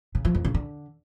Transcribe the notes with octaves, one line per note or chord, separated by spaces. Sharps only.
C#3
F3
F2
C#3
D3